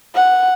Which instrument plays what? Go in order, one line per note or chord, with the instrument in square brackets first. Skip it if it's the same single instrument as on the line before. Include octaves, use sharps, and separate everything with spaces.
[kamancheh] F#5